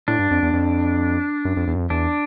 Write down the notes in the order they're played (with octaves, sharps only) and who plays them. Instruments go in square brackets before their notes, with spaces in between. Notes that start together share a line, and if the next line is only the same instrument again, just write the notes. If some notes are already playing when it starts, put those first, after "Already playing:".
[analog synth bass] A2 [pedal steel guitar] D4
[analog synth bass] G2
F2
E2
F2
F#2
F2
E2
F#2
F2
[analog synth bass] E2 [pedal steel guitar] D4